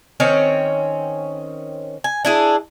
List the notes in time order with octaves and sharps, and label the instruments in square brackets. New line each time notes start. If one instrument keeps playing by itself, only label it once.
[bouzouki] D#3 C4 C#4 C#5
G#5
D4 E4 G#4